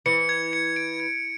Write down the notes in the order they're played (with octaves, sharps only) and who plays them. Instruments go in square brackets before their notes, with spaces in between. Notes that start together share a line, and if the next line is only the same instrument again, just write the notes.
[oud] E3 [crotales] C#7
[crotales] G#6
C#7
D7
G#6